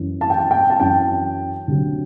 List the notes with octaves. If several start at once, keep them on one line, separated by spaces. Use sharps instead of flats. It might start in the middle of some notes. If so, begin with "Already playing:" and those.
Already playing: F#2 E3
A5
G5
A5
G5
A5
F#2 E3 G5
D2 C3 F#3